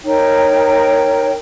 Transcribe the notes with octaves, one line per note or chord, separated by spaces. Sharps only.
D#4 A#4 C#5 G5